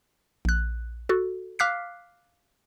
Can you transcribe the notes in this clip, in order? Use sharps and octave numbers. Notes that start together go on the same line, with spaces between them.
A#1 F#6
F#4 A4
F5 D6 F6 F#6 B6 C7